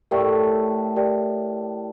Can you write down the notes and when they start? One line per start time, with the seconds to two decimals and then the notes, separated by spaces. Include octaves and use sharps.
0.11 A2 A3 G4 A#4 D5 G5
0.96 G4 A#4 D5 G5